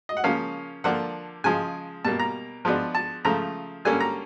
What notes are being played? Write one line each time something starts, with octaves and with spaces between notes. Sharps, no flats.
D#5
F#5
C#3 F3 A#3 C#4 F5
D3 F3 A#3 D4 F#5
C#3 F3 G#3 G#5
B2 G3 A#3 A5
A#5
F3 G#3 B3 D4
A5
C#3 F3 A3 A#5
D3 G3 A#3 C#4 G#5
A#5